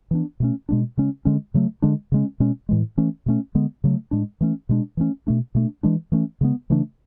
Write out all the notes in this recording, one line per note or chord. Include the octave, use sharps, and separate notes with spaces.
E3 B3 D4
B2 A3 C#4
B2 G#3 B3 D4
C#3 G#3 C#4
D3 G#3 C#4
C#3 F#3 A3
D3 G#3 D4
C#3 G#3 C#4
B2 G#3 C#4
A2 E3 G#3
E3 A3 C#4
B2 A3 C#4
D3 G#3 B3
C#3 F#3 A3
A2 G#3 D4
E3 A3 C#4
B2 G#3 D4
E3 A3 C#4
B2 A3 D4
B2 A3 D4
E3 G#3 D4
E3 A3 C#4
C#3 G#3 B3
C#3 E3 A3 D4